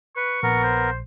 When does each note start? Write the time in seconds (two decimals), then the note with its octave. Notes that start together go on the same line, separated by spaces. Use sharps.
0.16 B4 C#6
0.43 A#1 B3 A#4
0.63 C5